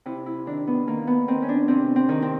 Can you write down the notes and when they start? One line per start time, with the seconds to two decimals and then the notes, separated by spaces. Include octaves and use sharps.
0.05 C3 E4
0.26 E4
0.46 D#3 D4
0.67 B3
0.87 D#3 A#3
1.07 B3
1.28 D#3 C4
1.42 C#4
1.49 D4
1.68 C3 C4
1.96 C4
2.09 D#3
2.22 C4